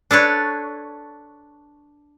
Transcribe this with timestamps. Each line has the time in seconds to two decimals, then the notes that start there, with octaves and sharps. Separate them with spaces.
0.11 D4 A4 B4 C#5